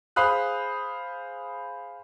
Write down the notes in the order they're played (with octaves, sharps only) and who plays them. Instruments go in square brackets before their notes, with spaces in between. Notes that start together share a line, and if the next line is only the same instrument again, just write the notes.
[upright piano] G#4 C5 F5 B5 D#6 F#6